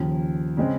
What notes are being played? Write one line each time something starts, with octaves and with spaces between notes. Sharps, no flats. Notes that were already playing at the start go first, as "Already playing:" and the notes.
Already playing: D#2 C#3 F3
C#3 G#3 C4